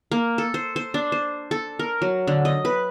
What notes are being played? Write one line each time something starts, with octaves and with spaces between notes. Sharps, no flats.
A#3
A4
C5
C5
D4
C5
A4
A#4
F#3
D3
D#5
B4